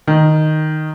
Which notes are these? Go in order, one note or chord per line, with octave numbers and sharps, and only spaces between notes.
D#3